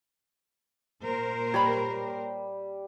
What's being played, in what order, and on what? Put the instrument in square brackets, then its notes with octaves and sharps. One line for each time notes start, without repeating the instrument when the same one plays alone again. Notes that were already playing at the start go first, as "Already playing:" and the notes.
[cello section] A#2 A#4 C5
[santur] G3 [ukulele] C#5 D5 B5